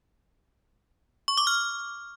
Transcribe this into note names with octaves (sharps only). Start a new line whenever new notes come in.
C#6
D6
F6